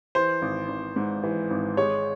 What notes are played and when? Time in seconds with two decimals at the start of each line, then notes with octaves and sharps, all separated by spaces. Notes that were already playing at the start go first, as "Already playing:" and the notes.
0.15 E3 C5
0.42 G#1
0.69 G#1
0.96 G#2
1.24 E3
1.50 G#1
1.77 G#3 C#5